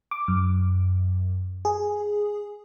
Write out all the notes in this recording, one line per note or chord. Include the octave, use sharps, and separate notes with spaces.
D6
F#2
G#4